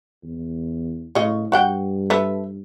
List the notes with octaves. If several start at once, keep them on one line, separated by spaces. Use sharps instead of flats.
E2
A2 C#3 C#5 D#5
G2 F#4 F#5 G5
A4 B4 E5